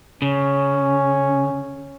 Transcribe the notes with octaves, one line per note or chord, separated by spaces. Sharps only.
C#3 C#4